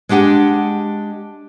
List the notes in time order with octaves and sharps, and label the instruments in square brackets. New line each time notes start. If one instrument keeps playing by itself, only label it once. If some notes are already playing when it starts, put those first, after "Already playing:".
[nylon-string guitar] G#3 D4 G4 F#5 G#5